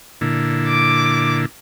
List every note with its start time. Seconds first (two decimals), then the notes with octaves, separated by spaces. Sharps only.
0.21 A#2 D3 E4
0.68 D6